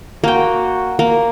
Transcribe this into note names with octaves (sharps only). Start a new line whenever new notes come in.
A#3 F#4 G5
A#3